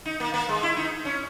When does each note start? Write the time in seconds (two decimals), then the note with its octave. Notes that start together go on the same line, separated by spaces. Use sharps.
0.05 D#4
0.20 A#3
0.34 A#3
0.49 G#3
0.63 E4
0.77 D#4
1.05 C#4